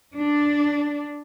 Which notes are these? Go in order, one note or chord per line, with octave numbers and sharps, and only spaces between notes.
D4